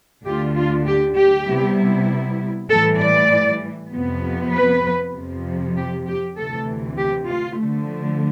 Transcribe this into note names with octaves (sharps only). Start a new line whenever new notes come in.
D2 D3 A3 D4 F4 G4
F4
G4
G4
C3 G3 B3 E4
A2 E3 G3 A4
D5
F2 C3 F3 B3
B4
F2 C3 F3
G4
G4
D2 C3 E3 A4
G4
F4
D3 F3 A3